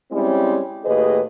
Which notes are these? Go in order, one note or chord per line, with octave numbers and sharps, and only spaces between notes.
G3 G#3 C4 C#4 E4
D#2 A2 G#4 B4 D#5